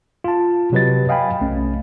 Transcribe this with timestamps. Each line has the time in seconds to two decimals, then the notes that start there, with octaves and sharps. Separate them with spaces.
0.24 F4 A5
0.72 C3 F#3 G4 B4 D#5 A6
1.09 D#5 F5 G5 G#5 B5
1.41 B1 A3 C#4